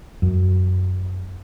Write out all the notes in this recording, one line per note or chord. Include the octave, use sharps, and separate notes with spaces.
F#2